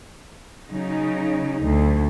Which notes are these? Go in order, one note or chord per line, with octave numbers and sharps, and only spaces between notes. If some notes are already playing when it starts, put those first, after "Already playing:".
C#3 F#3 D#4
D2